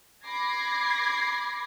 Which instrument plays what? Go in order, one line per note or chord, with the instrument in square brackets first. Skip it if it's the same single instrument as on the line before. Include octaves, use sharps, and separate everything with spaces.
[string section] B5 D6 G#6 A#6 C7